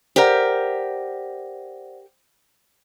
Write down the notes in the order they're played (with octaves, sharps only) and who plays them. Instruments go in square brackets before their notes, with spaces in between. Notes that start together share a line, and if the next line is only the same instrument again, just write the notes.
[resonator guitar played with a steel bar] G4 A#4 [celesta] C5 D5 F#5